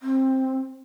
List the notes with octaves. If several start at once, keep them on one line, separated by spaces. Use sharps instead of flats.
C4